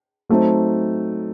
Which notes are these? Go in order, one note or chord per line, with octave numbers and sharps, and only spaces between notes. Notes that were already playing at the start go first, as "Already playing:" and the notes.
F#3 A3 C4 D#4